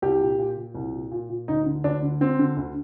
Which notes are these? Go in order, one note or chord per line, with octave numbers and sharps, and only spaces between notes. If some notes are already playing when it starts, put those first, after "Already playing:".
C2 G4
A#2
A#2
A#2
C2
A#2
A#2
A#2
D2 D#4
D3
D2 D4
D3
D3 C4
D3
D2